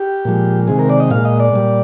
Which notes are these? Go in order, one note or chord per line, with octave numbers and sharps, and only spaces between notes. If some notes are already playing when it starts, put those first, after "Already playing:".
Already playing: G4
A#2 F3 G#3
C3 D#3 G#3 G#4
A#4
D5
D#5
A#2 G#3 F5
D#5
D5
A#2 G3